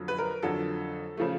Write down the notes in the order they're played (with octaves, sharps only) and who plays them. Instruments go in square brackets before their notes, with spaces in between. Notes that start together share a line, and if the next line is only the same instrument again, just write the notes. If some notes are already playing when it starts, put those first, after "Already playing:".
Already playing: [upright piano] F2 D3 F#3
B4
A#4
F2 D3 F#3 A4
C#3 F3 A3